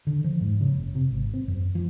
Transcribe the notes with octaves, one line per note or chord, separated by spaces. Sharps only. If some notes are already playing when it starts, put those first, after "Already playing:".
D3
F3
G#2
C#3
F#1
C3
G#1
C4
F#2
F3